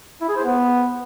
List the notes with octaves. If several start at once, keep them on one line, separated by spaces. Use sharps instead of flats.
E4
G#4
C5
B3